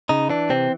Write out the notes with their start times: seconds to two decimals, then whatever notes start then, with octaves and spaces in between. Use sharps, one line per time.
0.09 C#3 D#4
0.30 E3 D4
0.50 C3 C4